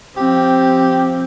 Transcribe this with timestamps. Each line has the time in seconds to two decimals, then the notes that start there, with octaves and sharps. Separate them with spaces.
0.17 F3 C4 G4